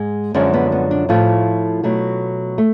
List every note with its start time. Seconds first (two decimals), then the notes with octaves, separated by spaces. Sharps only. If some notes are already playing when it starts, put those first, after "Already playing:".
Already playing: G#2 G#3
0.34 F#2 D3 F3 G#3 C#4
0.54 B3
0.72 B3
0.91 D4
1.09 A2 F3 A3 F4
1.83 B2 F#3 A3
2.58 A3